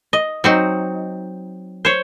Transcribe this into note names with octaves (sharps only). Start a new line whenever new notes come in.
D#5
F#3 C4 D#4
C5 C#5